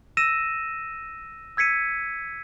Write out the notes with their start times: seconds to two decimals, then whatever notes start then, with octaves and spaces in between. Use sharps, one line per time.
0.17 E6 A#6 D#7 E7
1.57 E6 G#6 B6 C#7 D#7